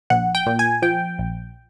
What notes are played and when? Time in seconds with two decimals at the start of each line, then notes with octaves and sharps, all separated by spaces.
0.10 A#1 F#5
0.35 G5
0.46 A#2
0.59 G#5
0.82 F3 G5
1.19 A#1